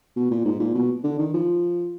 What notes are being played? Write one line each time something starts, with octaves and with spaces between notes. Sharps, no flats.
B2
A#2
G#2
A#2
B2
D3
D#3
F3